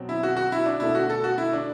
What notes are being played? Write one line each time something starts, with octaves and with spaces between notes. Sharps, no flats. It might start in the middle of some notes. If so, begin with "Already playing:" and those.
Already playing: B2 F#3 C4
E4
F#4
F#4
E4
D4
B2 A3 D4 E4
F#4
A4
F#4
E4
D4